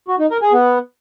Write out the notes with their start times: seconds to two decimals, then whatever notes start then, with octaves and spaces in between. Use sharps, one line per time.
0.08 F#4
0.19 D#4
0.30 A#4
0.42 G#4
0.53 B3